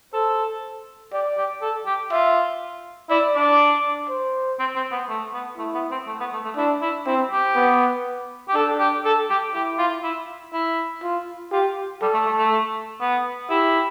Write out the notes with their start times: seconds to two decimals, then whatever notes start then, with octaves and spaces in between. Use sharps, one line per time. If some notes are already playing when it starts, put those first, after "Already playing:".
0.13 A4 C5
1.13 G4 D5
1.37 G4
1.62 A4
1.86 G4
2.11 F4 E5
3.10 E4 D5
3.36 D4
4.09 C5
4.59 C4
4.76 C4
4.91 B3
5.09 A3
5.34 B3
5.58 A3 E4
5.75 B3
5.91 C4
6.07 A3
6.20 B3
6.33 A3
6.45 A3
6.56 D4 E4
6.81 E4
7.06 C4 E4
7.31 G4
7.56 B3
8.49 G4
8.55 D4 A4
8.79 G4
9.05 A4
9.30 G4
9.54 E4 G4
9.78 F4
10.03 E4
10.53 E4
11.03 F4
11.52 F4 G4
12.02 G3 A4
12.13 A3
12.26 A3
12.38 A3
13.01 B3
13.50 E4 G4